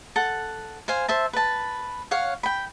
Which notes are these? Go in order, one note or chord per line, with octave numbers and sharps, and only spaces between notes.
A4 F#5
C5 F5 G#5
C5 E5 A5
B4 A5
C#5 F5 F#5
G5 B5